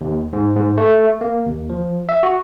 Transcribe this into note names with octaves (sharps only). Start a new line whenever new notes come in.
D#2
G#2
G#2
A3
A#3
D#2
F3
E5
F#4